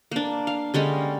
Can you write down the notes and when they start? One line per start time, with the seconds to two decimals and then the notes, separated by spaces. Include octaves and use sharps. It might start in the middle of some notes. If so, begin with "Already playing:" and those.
0.11 A#3 D4
0.47 F5
0.74 D3 G3 G#3 C#4